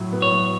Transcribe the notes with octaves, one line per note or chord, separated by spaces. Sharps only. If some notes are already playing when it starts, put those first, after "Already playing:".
Already playing: A2 F#3
B3
C#5
F#3